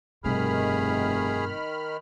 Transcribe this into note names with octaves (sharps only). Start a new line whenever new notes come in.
F1 G2 B2 D#3 G#4 B5 F6